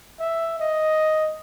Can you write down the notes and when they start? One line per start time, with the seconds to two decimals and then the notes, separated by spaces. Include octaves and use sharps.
0.20 E5
0.60 D#5